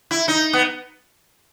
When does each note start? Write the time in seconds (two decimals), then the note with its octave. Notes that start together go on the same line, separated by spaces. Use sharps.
0.11 E4
0.28 D#4
0.53 B3